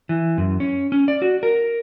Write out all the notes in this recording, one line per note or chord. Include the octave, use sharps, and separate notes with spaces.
E3
F#2
C#4
C#4
D5
F#4
A#4